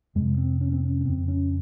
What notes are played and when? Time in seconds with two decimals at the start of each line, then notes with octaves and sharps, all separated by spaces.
0.15 F2 C3 G#3
0.38 C4
0.61 C#4
0.73 C4
0.83 C#4
1.01 C#4
1.05 F2 C#3 C4
1.28 C#4